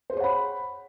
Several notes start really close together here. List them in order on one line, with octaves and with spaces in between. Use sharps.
C5 G#4 C#5 F#5 B5